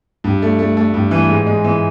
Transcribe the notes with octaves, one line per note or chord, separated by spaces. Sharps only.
G2
A3
A3
A3
G2
E3
G#2
G#3
E3